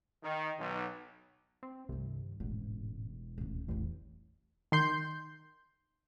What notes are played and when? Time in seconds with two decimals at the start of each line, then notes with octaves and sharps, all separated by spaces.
0.23 D#3
0.60 B1
1.63 C4
1.89 C2 G2 D#3
2.40 E1 A1 G#2
3.38 D#1 D2
3.68 D#1 A1 E2
4.72 D#3 C6 G6